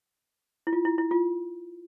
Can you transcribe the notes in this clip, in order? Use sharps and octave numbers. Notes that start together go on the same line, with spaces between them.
E4
F4
E4
E4
F4